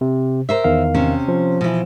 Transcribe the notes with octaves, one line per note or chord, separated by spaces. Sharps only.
C3
A#4 C5 E5
E2 D#3 F5
C3 C#4
F3
B2 E3